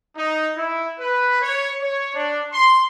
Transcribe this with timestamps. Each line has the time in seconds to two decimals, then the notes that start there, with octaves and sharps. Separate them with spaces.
0.17 D#4
0.57 E4
1.00 B4
1.42 C#5
1.82 C#5
2.15 D4
2.53 C6